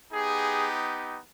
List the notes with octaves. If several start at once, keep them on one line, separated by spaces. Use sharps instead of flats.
B3 D#4 G4 G#4